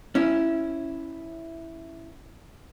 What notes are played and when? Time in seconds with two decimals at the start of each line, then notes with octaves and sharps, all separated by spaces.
0.15 C#4 E4